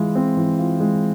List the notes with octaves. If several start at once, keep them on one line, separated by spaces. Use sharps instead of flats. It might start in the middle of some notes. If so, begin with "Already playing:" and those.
Already playing: E3 G#3 F4
C4
E3
F4
G#3